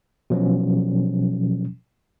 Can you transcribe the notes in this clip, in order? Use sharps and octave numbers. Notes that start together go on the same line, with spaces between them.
B2 F3 F#3 C#4